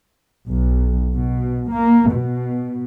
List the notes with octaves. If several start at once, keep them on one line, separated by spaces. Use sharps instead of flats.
B1
B2
A#3
B2